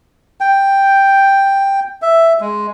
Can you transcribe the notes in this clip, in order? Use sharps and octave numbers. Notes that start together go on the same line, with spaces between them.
G5
E5
G#3